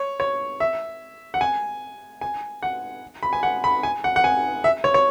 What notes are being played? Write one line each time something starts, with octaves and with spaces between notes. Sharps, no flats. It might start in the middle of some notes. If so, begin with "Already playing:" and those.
Already playing: C#5
C#5
E5
F#5
G#5
G#5
F#5
B5
G#5
F#5
B5
G#5
F#5
F#5
G#5
E5
C#5
C#5